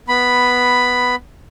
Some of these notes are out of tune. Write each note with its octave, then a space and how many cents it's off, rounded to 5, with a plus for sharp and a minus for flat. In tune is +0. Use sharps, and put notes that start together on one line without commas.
B3 +0 B5 +5